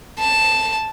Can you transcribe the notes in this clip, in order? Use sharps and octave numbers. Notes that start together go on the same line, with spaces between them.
A5